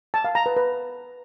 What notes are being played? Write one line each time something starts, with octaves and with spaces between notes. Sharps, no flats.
A5
F5
A#5
B4
B4